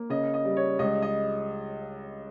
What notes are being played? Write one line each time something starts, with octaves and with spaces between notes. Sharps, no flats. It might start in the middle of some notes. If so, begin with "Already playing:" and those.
Already playing: A#3
C#3 D#5
D#5
G3
C#5
C#2 D#5
D#5